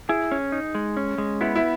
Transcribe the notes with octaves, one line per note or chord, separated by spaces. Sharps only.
E4 G#4
C#4
D#4
G#3
C#4
G#3
B3 E4
E4